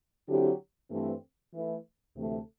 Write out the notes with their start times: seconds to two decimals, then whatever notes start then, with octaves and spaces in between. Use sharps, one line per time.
0.29 D3 F#3 C4 E4 G4
0.91 G2 E3 A3 C4
1.53 E3 A3 E4
2.15 D2 C3 E3 A3